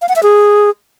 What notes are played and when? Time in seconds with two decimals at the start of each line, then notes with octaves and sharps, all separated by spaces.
0.02 F5
0.09 F#5
0.16 E5
0.23 G#4